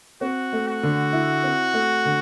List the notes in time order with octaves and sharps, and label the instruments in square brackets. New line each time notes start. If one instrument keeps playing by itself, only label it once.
[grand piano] C4 [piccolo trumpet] F#4
[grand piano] A3
[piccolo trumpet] F#4
[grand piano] D3
E4
C4
A3
D3